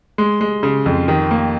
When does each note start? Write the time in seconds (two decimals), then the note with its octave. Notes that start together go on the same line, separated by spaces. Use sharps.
0.18 G#3
0.41 G#3
0.63 C#3
0.86 F2
1.08 D#3
1.31 A#3